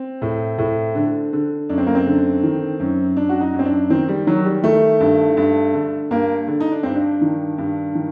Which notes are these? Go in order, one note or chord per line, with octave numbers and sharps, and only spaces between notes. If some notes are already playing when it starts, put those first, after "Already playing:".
Already playing: C4
A2
A2
D3
D3
F#2 D4
C4
A#3
C4
D3
D#3
F#2
F#2 D4
F#4
D#4
F#2
C4
D4
D#3 C4
G3
D#3 F#3
G3
D#3 A3
G2
G2
D3
G2 A#3
D3
D#4
D4
G2 C4
D4
D#3
G2
D#3